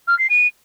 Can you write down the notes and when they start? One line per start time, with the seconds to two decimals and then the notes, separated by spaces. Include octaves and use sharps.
0.08 F6
0.19 C7
0.30 D#7